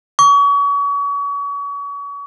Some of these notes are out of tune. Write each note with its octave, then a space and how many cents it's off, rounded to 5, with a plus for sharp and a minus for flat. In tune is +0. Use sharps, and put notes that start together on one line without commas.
C#6 +35